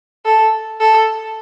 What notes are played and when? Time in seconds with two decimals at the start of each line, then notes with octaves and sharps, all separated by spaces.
0.25 A4
0.81 A4